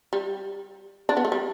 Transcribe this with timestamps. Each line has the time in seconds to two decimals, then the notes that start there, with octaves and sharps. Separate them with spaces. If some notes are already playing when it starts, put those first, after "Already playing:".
0.13 G3
1.09 D4
1.17 B3
1.25 A3
1.32 G3